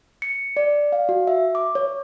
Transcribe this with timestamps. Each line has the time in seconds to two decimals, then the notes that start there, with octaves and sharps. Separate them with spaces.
0.22 C#7
0.57 D5
0.92 F5
1.09 F#4
1.27 E5
1.55 D6
1.75 C#5